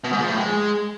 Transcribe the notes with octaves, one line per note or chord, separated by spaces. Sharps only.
B2
G#2
F3
A2
G#3